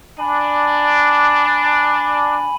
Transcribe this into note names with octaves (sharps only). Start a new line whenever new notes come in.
D4 G#5 B5